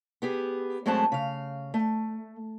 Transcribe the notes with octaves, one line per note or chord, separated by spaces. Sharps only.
B3 G4 G#4
F#2 G#3 A3 C4 F#5 A5
C#3 F5
A3